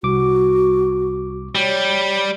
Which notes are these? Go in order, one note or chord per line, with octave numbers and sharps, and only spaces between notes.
C2 F#4 D6
G3 C#5